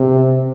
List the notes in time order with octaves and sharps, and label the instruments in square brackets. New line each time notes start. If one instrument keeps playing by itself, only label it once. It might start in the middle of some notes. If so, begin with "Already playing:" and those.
Already playing: [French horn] C3